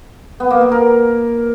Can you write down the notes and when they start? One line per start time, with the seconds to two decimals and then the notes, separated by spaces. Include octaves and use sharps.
0.40 B3
0.51 A#3
0.61 A#3
0.72 A#4